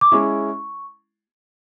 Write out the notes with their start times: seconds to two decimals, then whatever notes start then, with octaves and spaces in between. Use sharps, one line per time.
0.01 D6
0.12 G#3 C#4 E4 C#6